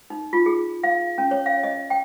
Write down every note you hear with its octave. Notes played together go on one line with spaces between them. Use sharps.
D#4
F4
G#4
F5
C#4
C#5
F5
D#5
G5